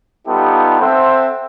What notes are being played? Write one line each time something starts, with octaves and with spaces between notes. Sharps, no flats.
G3 B3 D#4 F4 G4 A4
C4 A4 C5 E5 F#5 G5